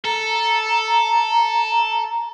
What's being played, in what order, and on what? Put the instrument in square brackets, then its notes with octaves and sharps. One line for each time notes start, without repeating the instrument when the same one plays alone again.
[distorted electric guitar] A4 [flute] A#5